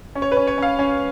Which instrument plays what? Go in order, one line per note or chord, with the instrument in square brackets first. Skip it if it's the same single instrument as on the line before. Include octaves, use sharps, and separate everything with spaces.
[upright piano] C#4
C#5
B4
C#4
C#5
C#4 F5
C#4